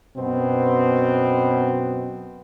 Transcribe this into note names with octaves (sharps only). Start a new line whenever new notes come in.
F#2 B2 B3 C4